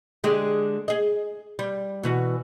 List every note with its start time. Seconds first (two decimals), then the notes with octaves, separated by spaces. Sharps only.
0.24 D3 G#3 G4
0.88 G#4 D#5
1.59 G3
2.03 B2 E3 F#4